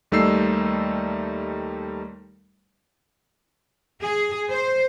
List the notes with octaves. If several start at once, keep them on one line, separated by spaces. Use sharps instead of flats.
D#2 G3 A3 D#4 E6 C7
G#4
C5